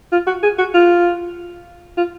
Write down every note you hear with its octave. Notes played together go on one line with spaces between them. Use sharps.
F4
F#4
G#4
F#4
F4
F4